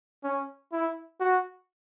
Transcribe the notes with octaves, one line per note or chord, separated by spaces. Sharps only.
C#4
E4
F#4